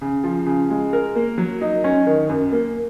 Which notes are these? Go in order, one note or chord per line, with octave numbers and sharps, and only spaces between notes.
C#3
F3
C#3
G#3
A#4
A#3
F#3
D#4
C#4
D#3
F#2
A#3